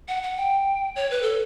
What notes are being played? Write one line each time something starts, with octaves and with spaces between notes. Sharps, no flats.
F#5
F#5
G5
C#5
B4
A4